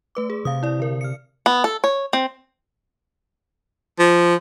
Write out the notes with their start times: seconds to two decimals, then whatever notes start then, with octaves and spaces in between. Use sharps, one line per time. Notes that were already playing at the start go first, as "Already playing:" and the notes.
0.15 A3 B4 D6
0.30 G#4
0.45 C3 F5 D#6
0.63 E4 D5
0.79 D3 A#4
1.01 F6 C#7
1.46 B3
1.64 A4
1.84 C#5
2.13 C4
3.99 F3